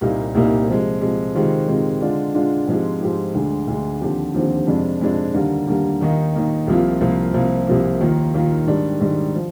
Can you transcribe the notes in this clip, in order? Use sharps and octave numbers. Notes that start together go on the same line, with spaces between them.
C2 A#2 G3 A#3 D#4
C2 A#2 G3 A#3 D#4
C3 F3 G#3
C3 F3 G#3
C3 D#3 G#3 C4 F4
C3 D#3 G#3 C4 F4
D3 G#3 D4 F4
D3 G#3 D4 F4
G#2 F3 G#3 C4 G4
G#2 F3 G#3 C4 G4
D2 D3 G#3
D2 D3 G#3
D#2 D3 F3 C4 G4
D#2 D3 F3 C4 G4
F2 C3 F3 G#3 D4
F2 C3 F3 G#3 D4
D#2 D3 G3 A#3
D#2 D3 G3 A#3
D#2 D#3 A#3 D#4
D#2 D#3 A#3 D#4
C2 C3 F3 A#3 F4
C2 C3 F3 A#3 F4
C2 C3 F3 A#3
C2 C3 F3 A#3
D#2 D#3 A#3 F4
D#2 D#3 A#3 F4
G#2 D#3 G3 D4
G#2 D#3 G3 D4
F3